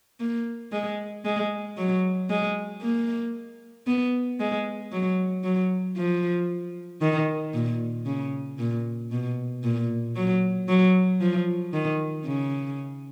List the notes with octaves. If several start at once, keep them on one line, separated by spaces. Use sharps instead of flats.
A#3
G#3
G#3
F#3
G#3
A#3
B3
G#3
F#3
F#3
F3
D#3
A#2
C#3
A#2
B2
A#2
F#3
F#3
F3
D#3
C#3